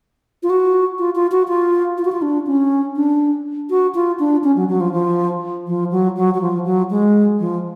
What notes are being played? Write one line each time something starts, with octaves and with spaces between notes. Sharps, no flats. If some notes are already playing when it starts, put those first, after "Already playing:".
F4
F#4
F4
F4
F#4
F4
F4
F#4
F4
D4
C#4
D4
F#4
F4
D4
C#4
F#3
F#3
F3
F3
F3
F#3
F#3
F#3
F3
F#3
G#3
F3